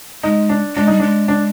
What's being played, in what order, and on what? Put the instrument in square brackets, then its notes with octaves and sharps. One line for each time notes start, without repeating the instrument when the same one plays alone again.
[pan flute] G#3 [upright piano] D#4
[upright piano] D4
[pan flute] G#3 [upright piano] D4
[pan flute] G3 [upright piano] D#4
[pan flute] G#3 [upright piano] D4
[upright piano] D4